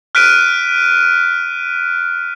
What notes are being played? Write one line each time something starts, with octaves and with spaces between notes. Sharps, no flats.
F6 F#6 B6 D7 D#7